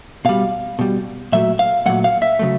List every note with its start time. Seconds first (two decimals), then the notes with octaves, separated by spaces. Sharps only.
0.25 B2 G3 F5
0.79 B2 G3
1.32 A#2 F#3 A3 E5
1.59 F5
1.86 A#2 F#3 A3 F#5
2.04 F5
2.22 E5
2.39 C#3 F#3 A3